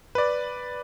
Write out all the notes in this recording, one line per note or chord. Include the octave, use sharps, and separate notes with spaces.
B4 D5